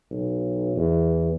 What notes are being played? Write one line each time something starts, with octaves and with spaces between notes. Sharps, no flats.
B1
E2